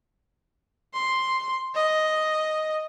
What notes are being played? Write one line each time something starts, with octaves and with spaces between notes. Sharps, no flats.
C6
D#5